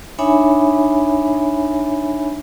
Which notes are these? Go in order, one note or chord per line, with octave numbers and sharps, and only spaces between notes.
D4 D#4 C#5 E5 G#5 B5